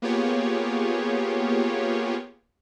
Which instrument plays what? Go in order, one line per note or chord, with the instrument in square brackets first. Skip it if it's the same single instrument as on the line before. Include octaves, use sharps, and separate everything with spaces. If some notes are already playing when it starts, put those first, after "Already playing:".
[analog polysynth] A#3 B3 F4 G4 G#4 C#5